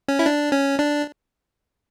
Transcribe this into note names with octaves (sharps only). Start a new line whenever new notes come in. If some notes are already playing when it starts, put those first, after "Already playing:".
C#4
E4
D4
C#4
D4